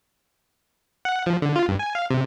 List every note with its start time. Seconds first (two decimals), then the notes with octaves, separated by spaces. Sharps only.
1.05 F#5
1.26 F3
1.42 D3
1.56 F4
1.68 G2
1.79 G#5
1.95 F5
2.10 C3